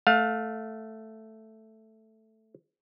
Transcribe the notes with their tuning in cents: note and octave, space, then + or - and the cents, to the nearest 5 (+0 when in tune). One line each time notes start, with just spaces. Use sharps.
A3 +0 F5 +25